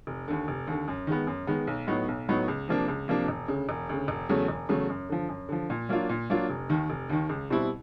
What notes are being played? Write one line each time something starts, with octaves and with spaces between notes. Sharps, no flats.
F1
D#2 D3
F1
D#2 D3
F#2
D#3 G#3 B3
F#2
D#3 G#3 B3
B1
A2 F#3 B3 D#4
B1
A2 F#3 B3 D#4
C#2
C3 F3 A#3 D4
C#2
C3 F3 A#3 D4
E1
D2 C#3
E1
D2 C#3
E1
E2 C#3 F#3 A3
E1
E2 C#3 F#3 A3
F#2
D3 F3
F#2
D3 F3
A#2
F#3 A#3 D4 F4
A#2
F#3 A#3 D4 F4
F1
D#2 D#3
F1
D#2 D#3
C#2
B2 G3 C4 E4